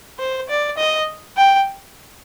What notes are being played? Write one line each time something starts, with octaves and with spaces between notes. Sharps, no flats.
C5
D5
D#5
G5